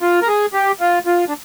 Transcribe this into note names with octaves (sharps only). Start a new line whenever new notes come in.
F4
A#4
G#4
G4
F4
F4
D4